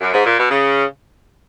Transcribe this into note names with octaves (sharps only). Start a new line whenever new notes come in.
F#2
G#2
A#2
B2
C#3